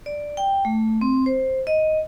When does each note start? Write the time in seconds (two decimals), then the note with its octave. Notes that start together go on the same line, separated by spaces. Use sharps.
0.06 D5
0.37 G5
0.65 A3
1.01 C4
1.26 C5
1.67 D#5